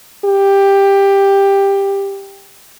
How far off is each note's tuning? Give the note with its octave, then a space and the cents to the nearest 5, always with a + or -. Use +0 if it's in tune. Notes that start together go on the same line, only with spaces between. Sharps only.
G4 +10